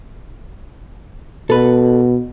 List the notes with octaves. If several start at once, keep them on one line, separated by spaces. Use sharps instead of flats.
B2 A4 B4